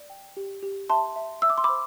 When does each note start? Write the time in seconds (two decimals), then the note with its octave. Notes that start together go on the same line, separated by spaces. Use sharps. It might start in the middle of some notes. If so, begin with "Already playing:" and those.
Already playing: D5
0.10 G5
0.37 G4
0.63 G4
0.89 E5 A5 C6
1.16 E5
1.42 E5 E6
1.50 D6
1.58 C6
1.64 C5 B5 D6